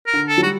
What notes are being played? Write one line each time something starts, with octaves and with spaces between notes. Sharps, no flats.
A#4
D3
A4
F#3
G3 F#4